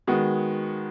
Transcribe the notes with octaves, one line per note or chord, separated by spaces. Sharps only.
D#3 G#3 B3 F#4